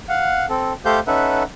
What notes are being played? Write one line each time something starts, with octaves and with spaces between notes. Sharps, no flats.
F5 F#5
C4 A4
A3 G4 A4 C5 F5 G6
C#4 D#4 A4 B4 E5 F#5